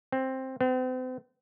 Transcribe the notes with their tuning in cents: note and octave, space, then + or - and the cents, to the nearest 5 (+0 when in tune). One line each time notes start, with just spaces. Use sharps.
C4 +10
C4 -40